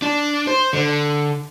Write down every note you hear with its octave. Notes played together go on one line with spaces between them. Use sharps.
D4
C5
D3